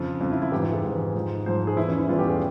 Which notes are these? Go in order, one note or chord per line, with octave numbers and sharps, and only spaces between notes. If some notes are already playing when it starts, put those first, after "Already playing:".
Already playing: F2 C#3 F3 F4
F2 C#3 F3 F4
E4
E4
G#2 E3 G4
F4
G#4
G#2 E3
G#2 F3
G#2 F3 C5
G#4
E2 E3 E4
C#4
E4
E2 E3 F4
G4
G#4